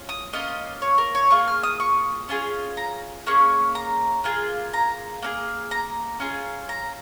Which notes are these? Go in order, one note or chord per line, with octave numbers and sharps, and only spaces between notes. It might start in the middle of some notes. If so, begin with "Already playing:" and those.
Already playing: C#4 F4
D#6
A#3 C#4 F4 D#5
C#5
A#4
C#5
A#3 F4 G#4 C#6
F6
D#6
C#6
C#4 F4 G#4
A#5
A#3 C#4 G#4 C#6
A#5
A#3 F4 G#4
A#5
A#3 D#4 G#4
A#5
C#4 F4 G#4
A#5